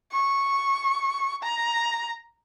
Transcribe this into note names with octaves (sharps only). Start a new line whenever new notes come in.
C#6
A#5